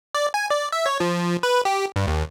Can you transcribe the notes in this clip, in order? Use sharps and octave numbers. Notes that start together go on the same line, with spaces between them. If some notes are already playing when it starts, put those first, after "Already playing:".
D5
G#5
D5
E5
C#5
F3
B4
G4
G2
D#2